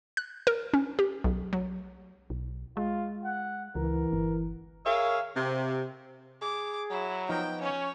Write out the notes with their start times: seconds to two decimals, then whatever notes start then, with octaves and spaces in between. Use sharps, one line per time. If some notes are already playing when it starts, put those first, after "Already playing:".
0.17 F#6
0.47 A#4
0.74 C#4
0.99 G4
1.24 B1
1.53 F#3
2.30 B1
2.77 G#3 F4
3.24 F#5
3.76 C#2 E3 A#4
4.12 G1
4.85 G#4 A#4 C#5 E5 F5
5.36 C3
6.42 G#4 D6
6.91 F#3 E4
7.29 F3 B3 D#4 G5
7.61 C#4 C#5